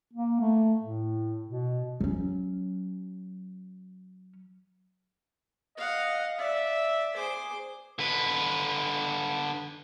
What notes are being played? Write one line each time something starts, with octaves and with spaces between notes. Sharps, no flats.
A#3
A3
A2
B2
F#3 C#4
D#5 F5 F#5
D5 E5
G#4 C5 D6
D3 B4